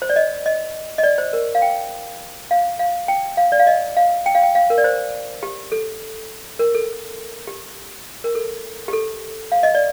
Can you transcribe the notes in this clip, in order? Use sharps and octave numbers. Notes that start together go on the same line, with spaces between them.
C5
D5
D#5
D#5
D#5
D5
C5
A#4
F5
G5
F5
F5
G5
F5
D5
F5
D#5
F5
G5
F5
G5
F5
A#4
D5
C5
G4
A4
A#4
A4
G4
A#4
A4
G4
A4
F5
D#5
D5